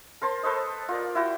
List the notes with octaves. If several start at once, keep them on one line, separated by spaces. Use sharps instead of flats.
A#4 C5 A5 C6
A4 B4 C5 D#5
F4 A#4 D5
E4 F#4 G5